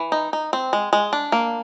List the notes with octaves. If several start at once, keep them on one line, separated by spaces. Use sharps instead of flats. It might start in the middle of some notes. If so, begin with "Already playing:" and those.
Already playing: E3
D#4
D#4
C4
G#3
G#3
D4
A#3